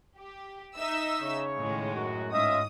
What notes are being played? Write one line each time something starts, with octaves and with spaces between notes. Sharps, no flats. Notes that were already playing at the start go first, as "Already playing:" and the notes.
G4
D#4 E5 E6
C#3 C#5
A2 D#3 G#3
F#2 F#4
G#2 C#4 F4 D#5 E5 D#6